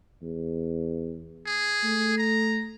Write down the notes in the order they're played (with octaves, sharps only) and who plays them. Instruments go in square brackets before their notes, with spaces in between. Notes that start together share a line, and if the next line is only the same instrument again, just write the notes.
[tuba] E2
[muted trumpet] G#4
[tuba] A3
[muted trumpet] A#5